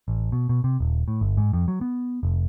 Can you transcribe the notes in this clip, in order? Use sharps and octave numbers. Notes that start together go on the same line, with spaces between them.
A1
B2
B2
C3
D#1
A2
G1
G#2
F2
F#3
B3
F1